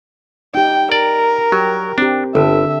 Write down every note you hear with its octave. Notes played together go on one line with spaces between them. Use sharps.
D#4 G4 G5
A#4 D5
F#3 G4
C4 D4 G4
G1 D3 A4 E5